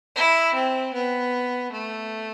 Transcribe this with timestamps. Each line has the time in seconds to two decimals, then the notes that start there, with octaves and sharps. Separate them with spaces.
0.16 E4
0.54 C4
0.94 B3
1.72 A3